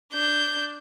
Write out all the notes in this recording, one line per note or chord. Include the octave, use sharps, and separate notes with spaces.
D4 G6